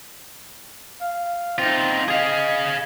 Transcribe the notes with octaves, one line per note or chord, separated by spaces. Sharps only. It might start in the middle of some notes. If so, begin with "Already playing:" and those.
F5
C4 D#4 F4
G#4 D#5 F5